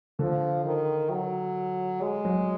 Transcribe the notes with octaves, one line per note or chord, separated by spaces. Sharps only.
D3 F3
D#3
F#3
G#3
F#3